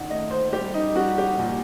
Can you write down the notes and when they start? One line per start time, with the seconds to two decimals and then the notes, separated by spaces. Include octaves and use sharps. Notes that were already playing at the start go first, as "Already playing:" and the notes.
Already playing: A#2 D#3 F#5
0.10 A3 D#5
0.31 C5
0.53 G3 G4
0.74 D#4
0.95 G3 F#4
1.18 G4
1.39 A#2